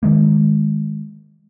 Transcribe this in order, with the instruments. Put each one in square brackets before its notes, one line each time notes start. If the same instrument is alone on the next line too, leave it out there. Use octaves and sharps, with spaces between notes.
[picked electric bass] D#3 G#3 A#3